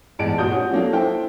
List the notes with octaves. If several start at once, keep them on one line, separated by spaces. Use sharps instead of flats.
A1 E2 G#3 A5 D7
A#2 F#4 D#6 G6
C#4 F#4
F#3 A#3 D4 F4 A4
E4 A4 C5 G5